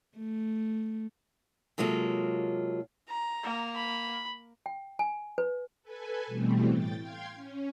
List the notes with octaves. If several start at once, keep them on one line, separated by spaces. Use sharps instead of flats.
A3
C3 F#3 G#3 A#3 F4 A4
A#5
A#3
B5
G5
G#5
B4
A4 B4 G#5
B2 E3 G3 A3 C4
A2 G5 A6
F5 G5 C6 G#6
C#4